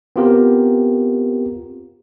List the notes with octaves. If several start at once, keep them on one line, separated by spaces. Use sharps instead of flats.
B3 C4 F4 G4 A#4